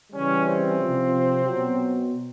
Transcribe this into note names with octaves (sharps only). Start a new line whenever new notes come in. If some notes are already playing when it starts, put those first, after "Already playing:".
C#3 E3 G3 C#4
C4
C3 F3
F#3
B2